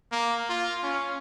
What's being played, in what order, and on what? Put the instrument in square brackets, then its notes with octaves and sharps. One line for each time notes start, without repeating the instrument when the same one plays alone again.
[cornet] A#3
F4
C#4